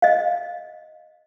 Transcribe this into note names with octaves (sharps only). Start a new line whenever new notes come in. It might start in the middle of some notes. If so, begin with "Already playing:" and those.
D#5 F5